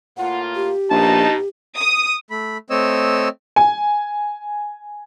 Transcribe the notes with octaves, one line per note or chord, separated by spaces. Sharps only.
A2 A#3 F4 F#5
G4
A#1 B2 B3 D#4 A5
D#6
A3 B5
A3 C4 C#5 D#5 E6
G#5